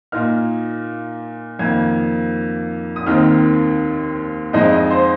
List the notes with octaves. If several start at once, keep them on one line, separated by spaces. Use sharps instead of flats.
A#2 A#3 D#4 F6
F2 D#3 A#3 G#6
D#6
D#2 D#3 C4 D#4 F6
F2 F3 G#3 C4 D#4 D#5
D#5
C5